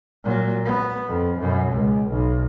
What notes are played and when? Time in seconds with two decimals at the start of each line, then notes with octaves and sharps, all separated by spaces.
0.24 A#2 F#3
0.65 B3
1.08 F2
1.40 F#2 B2
1.71 C#2
2.10 B1